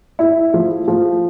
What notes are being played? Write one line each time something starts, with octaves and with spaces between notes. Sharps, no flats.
E4
F3
F3